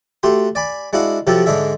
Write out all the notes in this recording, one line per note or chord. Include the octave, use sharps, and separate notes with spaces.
A3 F#4 G4 C6
D5 G#5 B5
G#3 D4 E4 F#4 F5 F#5
C3 F3 F#3 F#4 G4 A4
G#2 D3 G#3 D4 G#4 E5